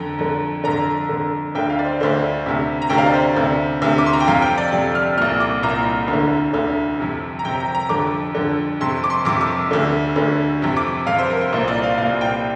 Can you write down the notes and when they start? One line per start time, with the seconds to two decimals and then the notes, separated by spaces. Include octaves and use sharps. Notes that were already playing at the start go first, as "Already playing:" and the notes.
Already playing: F2 D3 A#5
0.19 F2 D3
0.64 F2 D3 A#5
1.09 F2 D3
1.55 D2 D3 G5
1.69 F5
1.79 D5
1.85 C5
2.00 D2 D3 C5
2.46 D2 C3
2.82 A#5
2.90 D2 C3 G5
2.98 F5
3.06 D5
3.14 C5
3.36 D2 C3
3.82 D2 C3
3.98 D6
4.06 C6
4.13 A#5
4.20 G5
4.27 F2 C3 F5
4.42 G5
4.58 D5
4.73 F2 C3
4.95 F6
5.17 C2 A#2 F6
5.40 D6
5.63 C2 A#2 A#5
6.08 D2
6.13 D3
6.53 D2 D3
7.00 F2 C3
7.39 A#5
7.44 F2 C3 G5
7.60 A#5
7.75 A#5
7.89 F2 D3 D6
8.35 F2 D3
8.81 F2 C3 C6
9.04 D6
9.10 C6
9.25 F2 C3 D6
9.41 D6
9.71 D2 D3
10.16 D2 D3
10.62 F2 C3
10.77 D6
11.07 F2 C3 F5
11.19 C5
11.30 A#4
11.41 C5
11.53 C2 A#2 C5
11.68 D5
11.83 F5
11.98 C2 A#2 F5
12.21 G5